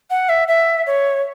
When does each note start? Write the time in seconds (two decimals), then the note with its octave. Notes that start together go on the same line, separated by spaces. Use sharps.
0.10 F#5
0.29 E5
0.48 E5
0.87 C#5